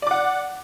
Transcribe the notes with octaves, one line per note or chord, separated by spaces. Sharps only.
D5 F#5 D6